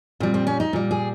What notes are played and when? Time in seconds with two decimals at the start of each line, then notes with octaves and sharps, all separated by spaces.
0.20 A#2 G3 C4
0.34 C4
0.47 C#4
0.60 D#4
0.73 A#2 G3
0.91 G#4